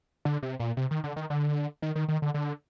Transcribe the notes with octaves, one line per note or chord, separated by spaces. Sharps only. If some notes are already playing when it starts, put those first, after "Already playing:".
D3
C3
A#2
C3
D#3
D3
D#3
D3
D#3
D#3
D#3
D3
D3